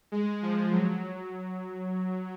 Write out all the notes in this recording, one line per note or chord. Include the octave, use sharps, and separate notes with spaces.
G#3
F3
F#3